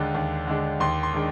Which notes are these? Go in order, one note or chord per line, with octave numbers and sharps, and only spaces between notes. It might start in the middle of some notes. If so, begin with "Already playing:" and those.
Already playing: D#2 D3 G#3 D4
D#2
D3 G#3 D4
D#2 C6
C6
D#3 G#3 D4